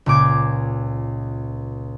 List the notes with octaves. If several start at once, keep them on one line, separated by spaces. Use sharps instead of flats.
C#2 A#2 D6 G#6